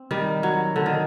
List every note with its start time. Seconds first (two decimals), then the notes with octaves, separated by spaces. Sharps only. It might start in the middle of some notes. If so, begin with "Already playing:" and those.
Already playing: C4
0.11 D#3 G3
0.43 F#3
0.76 D3
0.86 D#3